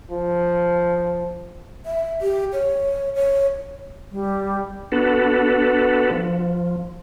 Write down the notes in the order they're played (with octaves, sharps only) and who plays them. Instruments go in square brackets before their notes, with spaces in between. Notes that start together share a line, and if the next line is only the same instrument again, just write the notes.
[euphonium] F3
[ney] E5
G4
C#5
C#5
[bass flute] G3
[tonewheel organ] B3 D4 F#4 A4 B4
F3